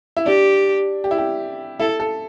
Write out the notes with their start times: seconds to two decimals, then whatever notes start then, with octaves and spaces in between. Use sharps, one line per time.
0.17 E4
0.26 D4 G4
1.04 G4
1.11 E4
1.18 G4
1.79 E4 A4
2.00 A4